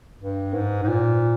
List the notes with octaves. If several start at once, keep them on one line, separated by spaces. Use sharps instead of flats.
G2
G#2
G#2
A#2